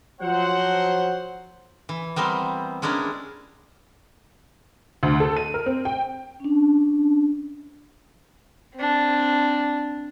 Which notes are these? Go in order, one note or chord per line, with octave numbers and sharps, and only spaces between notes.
F3 F#3 C5 F#5
E3
G3 B3 C4 A#4 C5
G#3 C#4 D4 E4 A#4
D2
A4
D#7
A#4
C4
G5
C#4 D4
C4 D4